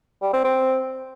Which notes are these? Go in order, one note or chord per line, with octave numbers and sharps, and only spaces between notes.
G3
C4
C4